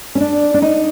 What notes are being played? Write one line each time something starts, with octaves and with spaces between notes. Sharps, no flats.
C#4
D4
D4
D#4